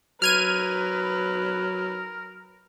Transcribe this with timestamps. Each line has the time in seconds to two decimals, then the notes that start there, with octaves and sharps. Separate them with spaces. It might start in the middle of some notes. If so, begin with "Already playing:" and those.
0.22 F#3 A#4 B4 F6 G#6 D#7